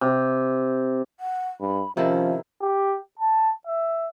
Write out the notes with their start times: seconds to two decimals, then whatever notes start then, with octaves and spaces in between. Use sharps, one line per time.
0.01 C3
1.20 F#5
1.61 G2 B5
1.97 C3 D#3 F3 C#4 E4
2.62 G4
3.19 A5
3.67 E5